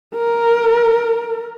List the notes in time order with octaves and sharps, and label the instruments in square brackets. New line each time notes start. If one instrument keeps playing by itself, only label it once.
[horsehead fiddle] A#4